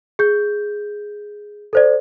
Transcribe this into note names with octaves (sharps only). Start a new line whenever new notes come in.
G#4 G6
A4 C5 D5